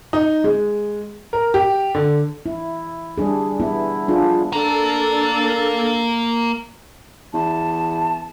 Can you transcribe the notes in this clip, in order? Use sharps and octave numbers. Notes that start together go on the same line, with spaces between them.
D#4
G#3
A#4
G4
D3
E4
G3 D4 G#4
B3 E4
D4 F4 G#4
A#3 D4 A4 A#4
E2 A5